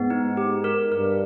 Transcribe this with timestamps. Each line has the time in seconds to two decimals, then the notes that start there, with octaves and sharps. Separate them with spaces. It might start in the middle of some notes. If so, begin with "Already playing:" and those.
Already playing: G#2 B3
0.10 D#4
0.37 G4
0.64 A#4
0.92 G2 A#4